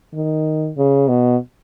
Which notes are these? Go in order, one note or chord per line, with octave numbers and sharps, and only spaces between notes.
D#3
C#3
B2